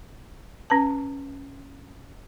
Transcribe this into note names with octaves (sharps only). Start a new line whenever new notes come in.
C#4 B4 A5